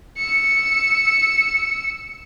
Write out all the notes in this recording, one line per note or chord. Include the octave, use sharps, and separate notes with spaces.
E6 C#7